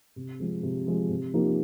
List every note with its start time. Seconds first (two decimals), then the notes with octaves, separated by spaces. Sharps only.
0.16 C3
0.39 F3 G#3
0.63 C3
0.87 F3 G#3
1.09 C3
1.33 F3 A#3 D#4 G4